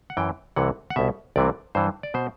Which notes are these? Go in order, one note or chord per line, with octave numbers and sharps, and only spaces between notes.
F#5
F#2 E3 G5
C2 C3 E3 F#5
F#5
C2 B2 E5
C2 C3 E3 D5
G2 E3 C5
D5
B2 C5